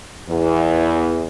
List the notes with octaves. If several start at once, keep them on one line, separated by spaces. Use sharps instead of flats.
E2